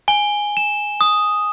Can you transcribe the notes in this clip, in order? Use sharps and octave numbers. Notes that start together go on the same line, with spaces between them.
G#5 G7
E7
D#6